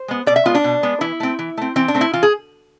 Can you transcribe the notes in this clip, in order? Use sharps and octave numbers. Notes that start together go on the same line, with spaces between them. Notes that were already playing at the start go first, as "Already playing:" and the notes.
Already playing: C5
G#3 B3
B2 D5
E5
G#3 B3 F4
D4
B2
G#3 B3
E3 E4
A3 C4
E3
A3 C4
E3 C4
D4
A3 C4
E4
E3 F4
G#4